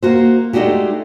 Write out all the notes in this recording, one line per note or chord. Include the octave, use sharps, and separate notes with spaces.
A#3 F#4 C5
G#3 A3 D4 D#4 F#4 G4